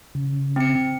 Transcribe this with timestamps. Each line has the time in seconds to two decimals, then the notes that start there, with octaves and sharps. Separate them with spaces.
0.15 C#3
0.56 C4 C#7